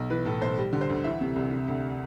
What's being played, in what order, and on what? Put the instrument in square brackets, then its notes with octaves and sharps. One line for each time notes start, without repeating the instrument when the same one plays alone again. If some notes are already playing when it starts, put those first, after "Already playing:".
Already playing: [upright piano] B1
E3 B4
A2 A4
B1 C5
G3
D3
C5
D2
E3 E5
C3
C2
C3
D2